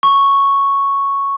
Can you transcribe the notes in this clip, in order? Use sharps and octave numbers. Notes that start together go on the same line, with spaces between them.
C#6